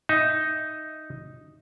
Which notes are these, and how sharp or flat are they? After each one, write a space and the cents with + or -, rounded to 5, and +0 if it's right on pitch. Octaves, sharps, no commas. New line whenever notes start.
D#4 +0 E5 +0